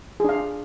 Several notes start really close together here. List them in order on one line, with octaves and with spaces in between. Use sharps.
G#4 D4 F5